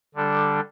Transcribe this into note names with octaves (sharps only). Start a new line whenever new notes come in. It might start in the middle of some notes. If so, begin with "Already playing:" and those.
D3 G3 D4 A4